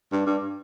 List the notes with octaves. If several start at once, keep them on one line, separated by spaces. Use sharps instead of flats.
G2
G2